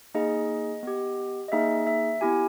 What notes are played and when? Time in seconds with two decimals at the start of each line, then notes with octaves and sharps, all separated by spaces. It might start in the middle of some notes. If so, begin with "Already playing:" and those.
0.14 A#3 D#4 G#4 D#5
0.83 B3 G4
1.48 D#5
1.52 A#3 D#4 G#4 E5
1.87 E5
2.21 B3 E4 G4 G#5